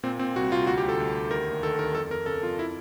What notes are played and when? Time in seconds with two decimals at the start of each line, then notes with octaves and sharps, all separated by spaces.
0.03 A#2 C4
0.19 A#2 C4
0.36 C2 F#4
0.52 C2 F4
0.67 D2 F#4
0.78 G4
0.84 D2 A4
1.00 D2
1.15 D2
1.31 D#3 A#4
1.48 D#2
1.63 D#3 A4
1.79 D#3 A#4
1.95 F2 A4
2.10 F2 A#4
2.26 C#3 A4
2.43 F2 F4
2.59 E4